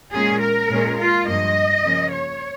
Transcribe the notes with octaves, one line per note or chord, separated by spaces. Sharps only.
A#2 G#3 C#4 G#4
A#4
A#2 G#3 C#4
F4
G2 F3 A#3 D#5
C#3 F3 A#3 C#4
C#5